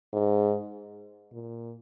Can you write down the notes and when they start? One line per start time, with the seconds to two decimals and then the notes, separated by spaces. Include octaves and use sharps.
0.13 G#2
1.32 A#2